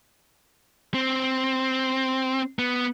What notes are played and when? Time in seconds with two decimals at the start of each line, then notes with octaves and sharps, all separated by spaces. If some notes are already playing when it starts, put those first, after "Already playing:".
0.94 C4
2.59 B3